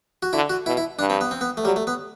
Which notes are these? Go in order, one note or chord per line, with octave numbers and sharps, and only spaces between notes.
F#4
D3 E4
F#4
B2 E4
E4
G2 D4
C4
B3
C4
B3
A3
F#3 G3
A3
B3